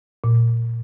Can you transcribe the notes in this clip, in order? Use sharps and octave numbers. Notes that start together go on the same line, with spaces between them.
A#2